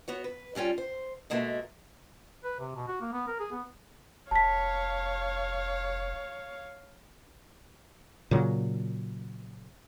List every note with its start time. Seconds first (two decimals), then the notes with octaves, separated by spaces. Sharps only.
0.08 B3 F#4 C#5
0.24 B4
0.55 G2 G3 C#4 F4 G5
0.78 C5
1.30 B2 G#3 A#3 F#4 A4 E5
2.44 B4
2.60 C3
2.76 B2
2.88 F#4
3.01 A#3
3.12 B3
3.28 A#4
3.39 G#4
3.52 B3
4.31 F1 C#5 F5 A5 B6
8.31 A#2 C#3 F#3